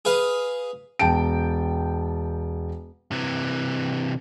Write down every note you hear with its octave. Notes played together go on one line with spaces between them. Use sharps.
G#4 B4 F5
E1 G5 A5 D7
C3 E3